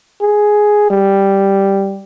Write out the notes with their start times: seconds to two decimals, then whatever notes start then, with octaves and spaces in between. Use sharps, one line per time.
0.21 G#4
0.90 G3